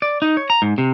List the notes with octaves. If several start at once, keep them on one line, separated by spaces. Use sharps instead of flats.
D5
D#4
C#5
A#5
G#2
C3